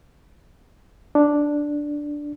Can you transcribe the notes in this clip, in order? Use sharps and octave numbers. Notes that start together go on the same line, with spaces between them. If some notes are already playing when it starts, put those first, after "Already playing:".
D4